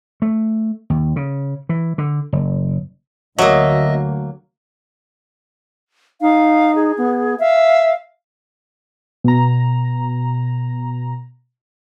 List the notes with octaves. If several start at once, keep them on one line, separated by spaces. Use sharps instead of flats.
A3
D#2
C#3
E3
D3
F#1
D2 F#3 A#3 D#5 E5
D#4 F5
G#4
B3
E5 F5
B2 A#5